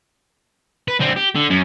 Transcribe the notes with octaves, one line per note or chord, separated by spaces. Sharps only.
B4
D3 C4
G4
D3
F#2